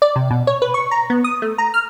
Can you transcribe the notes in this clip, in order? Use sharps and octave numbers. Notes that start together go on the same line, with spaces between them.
D5
C3
B2
C#5
B4
C#6
A#5
B3
D#6
A3
A#5
F6